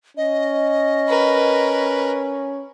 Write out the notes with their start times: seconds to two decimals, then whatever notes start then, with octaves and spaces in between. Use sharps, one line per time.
0.17 C#4 D#5
1.08 A#4 B4